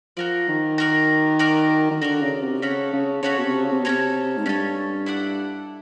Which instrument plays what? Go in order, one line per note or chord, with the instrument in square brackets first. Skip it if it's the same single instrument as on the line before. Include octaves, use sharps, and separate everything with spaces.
[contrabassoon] F3 [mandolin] F#4 A#4 D5
[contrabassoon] D#3
[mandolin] F#4 A#4 D5
F#4 A#4 D5
[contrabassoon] D#3
[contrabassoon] D3 [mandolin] F#4 A#4 D5
[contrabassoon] C#3
C3
[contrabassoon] C#3 [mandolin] C#4 F#4 A4 C#5
[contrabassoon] C#3
[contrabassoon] C#3 [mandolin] C#4 F#4 A4 C#5
[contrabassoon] B2
C3
C#3
C3
B2
[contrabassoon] C3 [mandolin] C#4 F#4 A4 C#5
[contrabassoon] G#2
[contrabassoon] G2 [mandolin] C#4 F#4 A4 C#5
[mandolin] E4 A4 D5 F#5